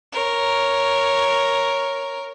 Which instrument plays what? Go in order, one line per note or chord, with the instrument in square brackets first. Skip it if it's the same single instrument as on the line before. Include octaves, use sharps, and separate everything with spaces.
[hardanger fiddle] A#4 C#5